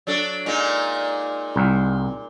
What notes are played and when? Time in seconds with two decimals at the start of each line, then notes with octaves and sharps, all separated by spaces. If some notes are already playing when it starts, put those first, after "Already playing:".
0.07 F#3 D4 A4
0.46 A#2 G#3 D#4
1.56 C2